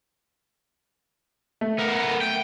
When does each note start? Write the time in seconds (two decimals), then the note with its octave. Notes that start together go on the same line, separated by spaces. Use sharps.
1.61 A3
1.78 B3 A#4
2.21 G5